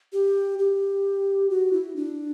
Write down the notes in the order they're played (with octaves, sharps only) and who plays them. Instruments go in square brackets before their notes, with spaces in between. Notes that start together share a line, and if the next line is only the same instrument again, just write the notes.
[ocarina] G4
G4
F#4
E4
D4